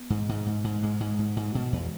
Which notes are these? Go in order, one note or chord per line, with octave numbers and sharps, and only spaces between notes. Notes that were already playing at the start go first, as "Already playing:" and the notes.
Already playing: B3
G#2
G#2
G#2
G#2
G#2 G#3
G#2
G#2
G#2
B2
E2